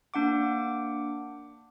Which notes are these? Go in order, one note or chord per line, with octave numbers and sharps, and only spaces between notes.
A#3 D4 F#5 D6